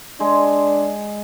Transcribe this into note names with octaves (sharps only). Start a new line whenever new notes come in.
G#3 D4